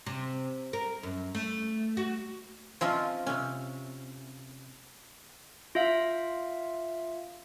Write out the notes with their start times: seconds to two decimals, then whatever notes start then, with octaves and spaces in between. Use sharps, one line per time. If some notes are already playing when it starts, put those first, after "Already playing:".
0.06 C3
0.73 A#4
1.03 F#2
1.35 A3
1.97 F#4
2.81 F3 C4 C#4 F4 D#5 E5
3.26 C3 C#4
5.75 F4 E5 F5